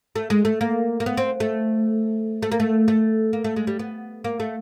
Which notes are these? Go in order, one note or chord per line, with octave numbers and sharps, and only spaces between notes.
A3
G#3
A3
A#3
A#3
B3
C4
A3
A3
A#3
A3
A3
A#3
A3
G#3
G3
B3
A#3
A3